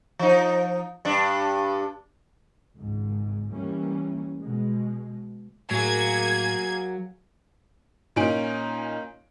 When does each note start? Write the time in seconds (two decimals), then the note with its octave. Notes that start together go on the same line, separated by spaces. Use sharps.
0.19 F3 D#4
1.05 G2 D4
2.79 G#1 C#2 G#2
3.53 E3 G3 A#3 C#4
4.41 B2 G#3
5.71 A2 F#3 A#3 G#4 G#6
8.16 A#2 C#4 D#4 G#5 D7 F#7